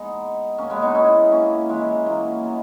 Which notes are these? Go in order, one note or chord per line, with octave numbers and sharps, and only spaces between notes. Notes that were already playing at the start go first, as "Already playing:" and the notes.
Already playing: G#3 B3 D#4
A#3 C#4
G#3 B3
B3 D#4
C#4 E4
A#3 C#4
E3 G#3
F#3 A#3
G#3 B3